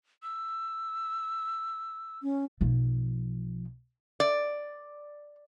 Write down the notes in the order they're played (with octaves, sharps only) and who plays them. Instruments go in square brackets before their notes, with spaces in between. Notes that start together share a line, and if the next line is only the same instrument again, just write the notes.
[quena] E6
[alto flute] C#4
[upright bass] B1 F3
[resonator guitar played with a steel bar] D5